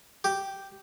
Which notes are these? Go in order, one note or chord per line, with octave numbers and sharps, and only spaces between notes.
G4